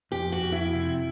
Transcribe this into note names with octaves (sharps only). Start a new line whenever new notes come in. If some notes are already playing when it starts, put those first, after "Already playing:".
F2 G4
F#4
F2
E4
C3